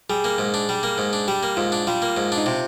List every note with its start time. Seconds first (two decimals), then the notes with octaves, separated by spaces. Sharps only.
0.10 G3 G#4
0.24 A#3
0.38 G#2
0.54 D4
0.69 G3
0.83 A#3
0.98 G#2
1.13 D4
1.28 G3 G4
1.43 A#3
1.57 G#2 F4
1.72 D4
1.87 G3 F4
2.02 A#3
2.17 G#2
2.32 D4
2.38 D#4
2.46 C3 F4